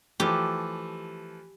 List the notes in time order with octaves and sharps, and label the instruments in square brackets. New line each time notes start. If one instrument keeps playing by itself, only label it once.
[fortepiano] E3 F3 A3 [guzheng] G4